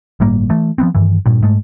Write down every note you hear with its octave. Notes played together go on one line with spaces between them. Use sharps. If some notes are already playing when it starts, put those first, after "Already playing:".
G1 A2 G3 A#3
E3 A3
F3 G#3 B3 C4
G2 D#3 E3
G2 A#2
G#2 G#3 A3